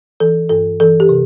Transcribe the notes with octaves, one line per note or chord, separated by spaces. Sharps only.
E3 A4
G2 A4
E3 A4
G4
C3